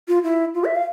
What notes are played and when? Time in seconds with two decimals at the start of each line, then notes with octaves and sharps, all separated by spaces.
0.08 F4
0.23 E4
0.55 F4
0.65 E5
0.75 F5